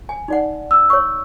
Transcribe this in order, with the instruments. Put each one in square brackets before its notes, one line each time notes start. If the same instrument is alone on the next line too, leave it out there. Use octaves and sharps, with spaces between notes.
[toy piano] G#5
D#4 D5 F#5
[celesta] E6
[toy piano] C#5 C#6